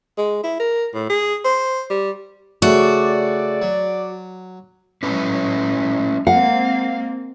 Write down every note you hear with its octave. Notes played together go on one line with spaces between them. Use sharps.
G#3
E4
A#4
A2
G#4
C5
G3
C#3 A3 F#4 D5
F#3
F#3 G#3 C#4 E4 B4
G#3 A#3 C4 F5 F#5